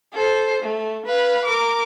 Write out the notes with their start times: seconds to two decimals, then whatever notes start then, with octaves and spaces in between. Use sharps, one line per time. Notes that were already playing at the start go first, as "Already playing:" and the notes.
0.13 A4 C5
0.62 A3
1.06 B4 F5
1.45 A#4 D6